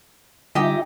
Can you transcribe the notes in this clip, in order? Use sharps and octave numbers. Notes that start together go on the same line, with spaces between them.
D3 G3 D#4 F4 G4 D#5 E5 G#5